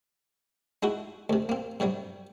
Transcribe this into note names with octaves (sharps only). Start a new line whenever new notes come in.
G#3 D#4 E4 F#4
D2 C3
A#3 C4
G2 C3 F#3 G3